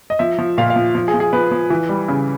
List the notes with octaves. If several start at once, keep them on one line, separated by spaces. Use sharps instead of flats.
D#5
F3 E5
F3
A#2 F5
F5
F3
F3
G#4
F3
G#4
F3 B4
F3
E3
G3
C#3